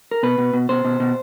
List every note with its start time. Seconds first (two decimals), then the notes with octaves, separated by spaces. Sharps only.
0.11 A#4
0.23 B2 B4
0.38 B2
0.54 B2
0.69 B2 C5
0.85 B2
1.00 B2